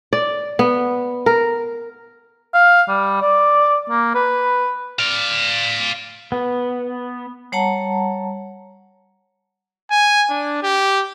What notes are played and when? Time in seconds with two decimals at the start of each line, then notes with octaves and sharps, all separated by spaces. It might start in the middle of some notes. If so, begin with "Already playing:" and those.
0.13 D5
0.59 B3
1.26 A#4
2.54 F5
2.88 G3
3.22 D5
3.90 A#3
4.15 B4
4.99 D5 F5
6.32 B3
7.52 G3 C#5 F#5 A5 A#5
9.91 G#5
10.30 D4
10.63 G4